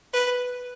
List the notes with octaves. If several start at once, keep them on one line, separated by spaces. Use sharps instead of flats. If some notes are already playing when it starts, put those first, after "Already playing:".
B4